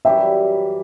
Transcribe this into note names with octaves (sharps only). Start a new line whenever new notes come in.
F#2 E3 G3 E5 G5